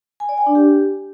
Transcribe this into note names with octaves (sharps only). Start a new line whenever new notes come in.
G#5
D5
G5
D4
G4